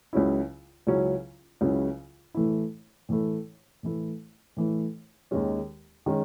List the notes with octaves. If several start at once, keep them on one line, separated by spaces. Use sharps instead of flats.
C#2 C#3 F#3 C#4 E4
C#2 C#3 F#3 C#4 E4
C#2 C#3 F#3 C#4 E4
A2 E3 A3 E4
A2 E3 A3 E4
A2 E3 A3 E4
A2 E3 A3 E4
D#2 D#3 G#3 C#4
D#3 G#3 C#4